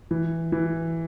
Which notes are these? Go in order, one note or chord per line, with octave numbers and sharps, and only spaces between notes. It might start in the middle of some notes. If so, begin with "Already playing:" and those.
E3
E3